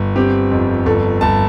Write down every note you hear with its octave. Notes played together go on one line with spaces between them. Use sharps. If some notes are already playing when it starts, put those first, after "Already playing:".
Already playing: G1
C4 G4
F2
G1 A4
G1 A5